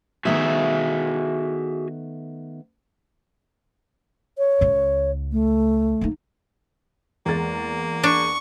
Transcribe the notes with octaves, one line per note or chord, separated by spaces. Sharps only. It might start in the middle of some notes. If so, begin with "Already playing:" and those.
D#3 A3 B3 F#4 G#4 E5
C#5
C#2 C#3
A3
A#3 D#4
E2 G#3 A#3 A6
D4 C#6